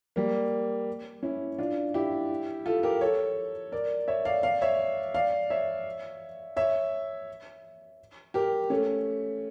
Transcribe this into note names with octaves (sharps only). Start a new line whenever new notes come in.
G3 A#3
C#4 E4
D4 F4
E4 G4
F4 A4
G4 A#4
A4 C#5
A#4 D5
C#5 E5
D5 F5
D5 F5
C#5 E5
D5 F5
C#5 E5
C#5 E5
G4 A#4
A3 C#4